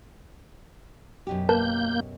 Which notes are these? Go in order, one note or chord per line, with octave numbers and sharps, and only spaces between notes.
F#2 B2 G4
A#3 A#4 B4 A5 G6